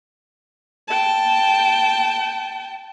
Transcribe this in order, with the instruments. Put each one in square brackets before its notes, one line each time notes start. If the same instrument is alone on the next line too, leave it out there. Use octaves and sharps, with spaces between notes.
[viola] G5 A5